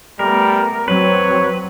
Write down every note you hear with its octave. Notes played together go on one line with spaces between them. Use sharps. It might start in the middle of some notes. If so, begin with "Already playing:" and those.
G3 A3 B3 A#4
E2 F#3 C4 B4 C#5